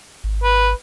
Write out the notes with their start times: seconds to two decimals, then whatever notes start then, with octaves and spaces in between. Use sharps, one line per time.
0.24 G#1
0.43 B4